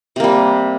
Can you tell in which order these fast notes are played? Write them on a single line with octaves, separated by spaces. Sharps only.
C3 A#3 G3